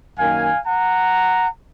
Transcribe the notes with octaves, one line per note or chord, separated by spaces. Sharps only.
F#2 D#3 A#3 F5 G#5
F#5 A#5